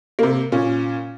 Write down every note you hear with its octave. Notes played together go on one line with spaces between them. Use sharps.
C3 A#3
A#2 C#4